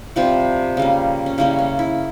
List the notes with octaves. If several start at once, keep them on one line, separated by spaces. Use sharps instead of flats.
C3 F3 G3 C4 F4
C#3 G3 A#3
C#4
C#3 G3 A#3 C#4 E4
C#4
E4